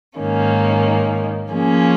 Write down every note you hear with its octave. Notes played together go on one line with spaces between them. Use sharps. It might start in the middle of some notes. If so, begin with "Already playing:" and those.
G#2 D#3 A#3 C#4
F3 A#3 C#4 G#4